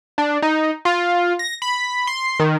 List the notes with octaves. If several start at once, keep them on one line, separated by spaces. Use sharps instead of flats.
D4
D#4
F4
A#6
B5
C6
D#3